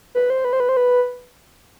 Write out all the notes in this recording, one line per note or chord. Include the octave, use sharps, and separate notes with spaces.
B4
C5
B4
C5
B4
C5
B4